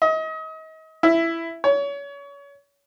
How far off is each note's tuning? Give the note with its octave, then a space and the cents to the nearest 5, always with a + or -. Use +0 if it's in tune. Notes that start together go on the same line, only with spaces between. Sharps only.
D#5 +35
E4 +10
C#5 +30